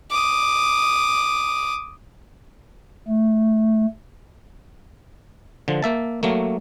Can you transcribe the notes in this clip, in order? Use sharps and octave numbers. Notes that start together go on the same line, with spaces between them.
D6 D#6
A3
D3 F3
A#3 E5 A5
F#3 A3 A#3